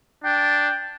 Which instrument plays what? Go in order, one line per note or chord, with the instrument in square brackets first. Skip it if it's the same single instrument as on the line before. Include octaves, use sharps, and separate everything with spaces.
[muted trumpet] D4 [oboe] G5